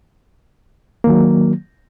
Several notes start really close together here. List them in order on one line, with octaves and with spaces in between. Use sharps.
A#3 D#3 F#3